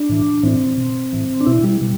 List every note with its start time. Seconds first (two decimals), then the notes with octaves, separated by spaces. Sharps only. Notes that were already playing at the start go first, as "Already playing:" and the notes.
Already playing: D4
0.09 A2 E3
0.43 A2 E3 C4
0.78 B2
1.13 A2 E3
1.41 D4
1.46 B2 E4
1.63 G3
1.81 B2 G3